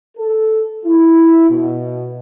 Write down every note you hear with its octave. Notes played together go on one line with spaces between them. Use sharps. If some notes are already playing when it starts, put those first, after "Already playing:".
A4
E4
B2